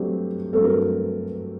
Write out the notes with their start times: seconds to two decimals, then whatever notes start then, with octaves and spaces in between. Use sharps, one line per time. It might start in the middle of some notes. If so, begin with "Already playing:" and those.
Already playing: G2 F#3 A3 C4 G4
0.53 G2 F#3 A3 C4 A4
0.64 A#4